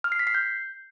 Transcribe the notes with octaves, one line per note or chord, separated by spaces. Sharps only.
F6
C7
B6
C7
G6